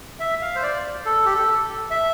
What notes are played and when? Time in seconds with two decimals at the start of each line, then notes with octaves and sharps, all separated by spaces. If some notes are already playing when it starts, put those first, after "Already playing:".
0.20 E5
0.41 F5
0.55 C5
0.63 D5
1.05 A4
1.26 G4
1.35 A4
1.91 E5